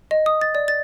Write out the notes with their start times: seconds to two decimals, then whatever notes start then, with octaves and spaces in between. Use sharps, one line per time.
0.11 D#5
0.26 D#6
0.41 A6
0.55 D5
0.68 A6